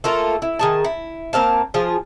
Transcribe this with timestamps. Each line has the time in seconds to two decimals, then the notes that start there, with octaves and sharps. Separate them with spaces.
0.04 A3 A#3 F4 A4
0.42 E4
0.59 D#3 G#4 A5
0.84 E4
1.33 A#3 C4 F5 A5
1.74 F3 F4 G#4